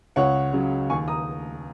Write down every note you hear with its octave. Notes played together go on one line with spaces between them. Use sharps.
C#2 C#5 F#5
C#3 F#3
D#2 G#5 C#6
A#5 D#6